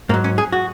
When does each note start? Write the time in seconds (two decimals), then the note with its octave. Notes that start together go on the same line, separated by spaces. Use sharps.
0.09 G#2 A#3
0.14 F#3
0.24 C#4
0.38 G#4
0.52 F#4